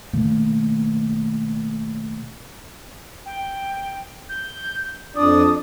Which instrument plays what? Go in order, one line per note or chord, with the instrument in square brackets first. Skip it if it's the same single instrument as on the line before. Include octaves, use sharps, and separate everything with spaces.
[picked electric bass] B2 D#3 A3 A#3
[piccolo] G5
G6
[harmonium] F2 D4 D5 [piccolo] D#6